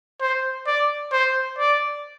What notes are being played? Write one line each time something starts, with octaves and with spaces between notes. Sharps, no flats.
C5
D5
C5
D5